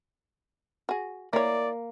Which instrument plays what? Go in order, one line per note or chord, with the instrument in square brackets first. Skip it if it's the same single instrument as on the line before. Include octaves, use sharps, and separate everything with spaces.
[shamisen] F#4 G#4
[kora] A#3 [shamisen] E4 C#5 [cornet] D5